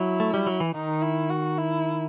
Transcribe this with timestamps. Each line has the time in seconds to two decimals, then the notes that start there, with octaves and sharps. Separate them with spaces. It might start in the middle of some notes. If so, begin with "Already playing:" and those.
Already playing: F#3 E4
0.20 A3
0.34 G3
0.47 F#3
0.60 E3
0.74 D#3 D#4
1.02 E4
1.30 F#4
1.58 E4